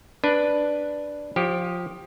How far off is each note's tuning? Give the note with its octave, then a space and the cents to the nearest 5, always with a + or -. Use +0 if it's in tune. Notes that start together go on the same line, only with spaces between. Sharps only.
D4 +0 B4 +0
F3 +20 G4 -5